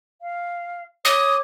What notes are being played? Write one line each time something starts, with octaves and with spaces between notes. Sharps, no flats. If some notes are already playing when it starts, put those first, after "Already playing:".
F5
C#5 D6 D#6